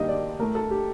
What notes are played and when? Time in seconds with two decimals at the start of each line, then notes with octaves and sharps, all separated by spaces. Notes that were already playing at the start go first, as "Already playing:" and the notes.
Already playing: G2 D#3 G3 A#3 D#5 G5
0.08 D5
0.39 A2 A3 A#4
0.55 A4
0.70 G4